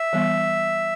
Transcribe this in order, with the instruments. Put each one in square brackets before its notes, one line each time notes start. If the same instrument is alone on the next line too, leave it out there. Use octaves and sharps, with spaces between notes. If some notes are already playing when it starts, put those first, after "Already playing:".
Already playing: [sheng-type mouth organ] E5
[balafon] E3 G3 B3